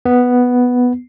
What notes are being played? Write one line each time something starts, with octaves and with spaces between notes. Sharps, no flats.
B3